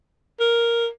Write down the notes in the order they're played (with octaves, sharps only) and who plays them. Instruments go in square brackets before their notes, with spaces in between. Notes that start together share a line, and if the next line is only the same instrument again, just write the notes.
[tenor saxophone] A#4